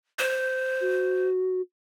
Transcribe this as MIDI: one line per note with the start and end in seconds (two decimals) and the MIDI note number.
0.19 1.27 72
0.81 1.61 66